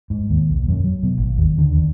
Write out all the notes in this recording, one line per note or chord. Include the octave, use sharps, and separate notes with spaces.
G#2
D#2
B1
F#2
F#3
B2
G#1
D#2
D3
D#2